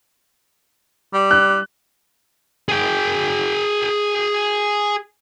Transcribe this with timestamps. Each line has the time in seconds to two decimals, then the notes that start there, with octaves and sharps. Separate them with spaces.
1.13 G3
1.31 F#6
2.69 G#4 G5